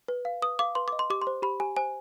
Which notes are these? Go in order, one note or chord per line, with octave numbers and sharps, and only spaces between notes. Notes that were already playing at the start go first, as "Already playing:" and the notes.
B4
F5
B4 D#6
F5 D6
B4 C6
D#5 D6
C6
G4 D6
C6
C5
G4 B5
G4 G#5
C5 G#5